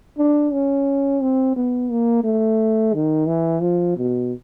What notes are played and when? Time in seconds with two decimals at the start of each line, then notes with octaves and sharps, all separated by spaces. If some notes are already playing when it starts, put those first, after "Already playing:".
0.18 D4
0.53 C#4
1.22 C4
1.56 B3
1.91 A#3
2.24 A3
2.94 D#3
3.27 E3
3.62 F3
3.97 B2